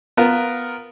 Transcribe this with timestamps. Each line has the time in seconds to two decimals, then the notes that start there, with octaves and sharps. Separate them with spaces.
0.17 B3 F4 A#4